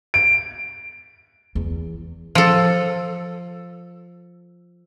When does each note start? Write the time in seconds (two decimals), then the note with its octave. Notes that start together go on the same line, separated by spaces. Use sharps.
0.14 D7
1.55 E2
2.35 F3 A4